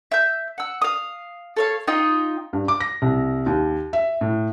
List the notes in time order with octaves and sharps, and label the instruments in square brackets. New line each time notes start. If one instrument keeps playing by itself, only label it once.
[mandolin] E5 G6
F#5 E6
F5 D#6
A4 C#5 F5
D#4 F4 D#5 G5
[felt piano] G2
D6
A#6
C2
D#2
E5
A2